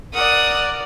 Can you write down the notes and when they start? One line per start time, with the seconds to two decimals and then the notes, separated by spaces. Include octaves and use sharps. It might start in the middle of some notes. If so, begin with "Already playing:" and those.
0.14 A#4 D5 F#5 D#6 F#6